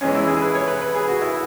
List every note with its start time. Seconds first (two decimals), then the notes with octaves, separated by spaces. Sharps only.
0.01 E2 E3 G#3 C#4
0.15 E4
0.27 G#4
0.42 B4
0.55 C#5
0.68 B4
0.82 B4
0.95 G#4
1.08 F#4
1.22 E4